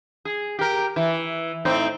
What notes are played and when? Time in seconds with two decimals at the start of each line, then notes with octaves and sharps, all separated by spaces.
0.25 G#4
0.59 G4 A#4
0.96 E3
1.65 A2 C4 D#4